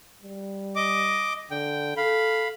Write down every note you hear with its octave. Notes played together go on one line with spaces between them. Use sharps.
G3
D#5 D6
D3 G5
A4 F5 B5